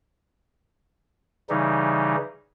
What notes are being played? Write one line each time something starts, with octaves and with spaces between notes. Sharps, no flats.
C#3 E3 G3 D#4